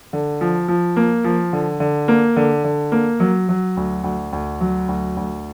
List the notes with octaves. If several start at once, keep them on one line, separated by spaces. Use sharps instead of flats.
D3
F3
F3
A#3
F3
D3
D3
A#3
D3
D3
A#3
F#3
F#3
D2
D2
D2
F#3
D2
D2